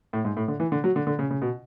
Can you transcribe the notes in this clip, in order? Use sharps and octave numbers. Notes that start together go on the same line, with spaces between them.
A2
G#2
A2
D3
E3
D3
F#3
D3
D3
C#3
C#3
B2